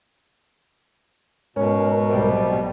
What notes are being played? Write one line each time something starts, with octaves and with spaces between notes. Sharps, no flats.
G#2 B2 C#4 A#4
B1 A2 C3 G3